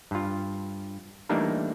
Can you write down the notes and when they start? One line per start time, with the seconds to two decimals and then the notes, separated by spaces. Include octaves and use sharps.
0.11 G2 F4
1.29 E3 G3 A3 A#3 D4 D#4